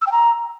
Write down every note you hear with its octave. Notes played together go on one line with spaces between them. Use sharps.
E6
G5
A#5